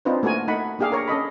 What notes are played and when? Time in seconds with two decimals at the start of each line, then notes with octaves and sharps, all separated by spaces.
0.05 C4 D4 D#4 F4 B4 C5
0.23 A3 A#3 F#4 A#4 G#5
0.48 A3 D#4 F#5 B5
0.79 A#3 D4 G4 G#4 F5
0.92 A#4 C#5 A#5
1.08 C#4 A4 D#5 B5